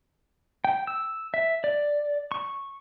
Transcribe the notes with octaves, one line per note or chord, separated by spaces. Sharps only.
G5
E6
E5
D5
C#6